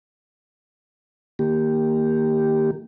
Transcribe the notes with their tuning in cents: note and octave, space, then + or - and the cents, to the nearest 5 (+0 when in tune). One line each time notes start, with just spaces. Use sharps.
D#3 +0 A#3 -5 G4 +0